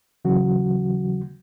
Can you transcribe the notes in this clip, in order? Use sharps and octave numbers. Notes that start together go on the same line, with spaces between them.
D#2 C#3 E3 F#3 F#4